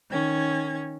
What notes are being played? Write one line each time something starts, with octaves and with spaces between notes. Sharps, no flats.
D#3 C#4 G#6